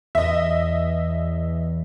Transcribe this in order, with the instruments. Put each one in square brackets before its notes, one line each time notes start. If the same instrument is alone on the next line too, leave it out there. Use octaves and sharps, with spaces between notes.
[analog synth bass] E2 [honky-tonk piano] D#5 E5